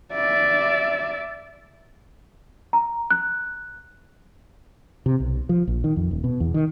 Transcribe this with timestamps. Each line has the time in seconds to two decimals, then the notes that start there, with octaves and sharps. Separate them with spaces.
0.14 D5 E5
2.73 A#5
3.11 F#6
5.06 C3
5.20 B1
5.49 F3
5.67 A#1
5.84 D#3
5.96 F2
6.11 D#1
6.24 B2
6.40 E2
6.54 D#3